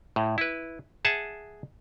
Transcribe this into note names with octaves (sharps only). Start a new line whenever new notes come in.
A2
E4 B4
G#4 E5 F#5 A5